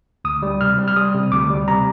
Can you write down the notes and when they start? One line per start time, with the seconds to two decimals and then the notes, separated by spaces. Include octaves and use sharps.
0.25 D2 D#6
0.43 G3
0.61 C3 F6
0.78 G3
0.88 F6
0.96 G3 D#6
1.14 C3
1.32 D2 D6
1.50 G3
1.68 C3 A#5